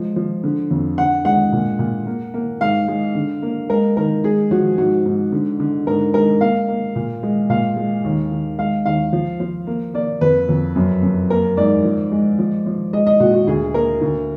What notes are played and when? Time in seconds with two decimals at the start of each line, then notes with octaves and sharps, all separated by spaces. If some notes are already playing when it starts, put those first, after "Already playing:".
Already playing: F3 G#3
0.16 F3
0.44 D3
0.71 F2
0.98 D3 F#5
1.25 G#3 F#5
1.53 A#2
1.79 A#2
2.07 A#3
2.34 A#3
2.61 G#2 F5
2.88 G#3
3.15 D3
3.42 A#3
3.70 G#3 A#4
3.97 D#3 A#4
4.24 G#3 G#4
4.51 F3 F#4
4.78 G#2 F#4
5.06 G#2
5.32 D3
5.60 D3
5.87 G#2 A#4
6.14 G#3 A#4
6.41 A#3 F5
6.68 A#3
6.96 A#2
7.23 G#3
7.50 A#2 F5
7.76 G#3
8.04 D#2
8.31 D#3
8.58 G#3 F5
8.86 D#2 F5
9.13 F3
9.40 F3
9.67 A#3
9.94 A#3 D5
10.21 F2 B4
10.49 F2
10.76 F#2
11.03 F#2
11.30 A#3 A#4
11.57 G#2 D5
11.84 F3
12.12 G#3
12.39 F3
12.66 F3
12.93 G#3 D#5
13.07 D#5
13.20 A#2 F#4
13.34 F#4
13.47 D2 G#4
13.74 A#3 A#4
14.01 D2